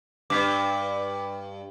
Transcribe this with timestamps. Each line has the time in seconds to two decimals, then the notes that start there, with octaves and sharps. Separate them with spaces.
0.30 G2 D6 B6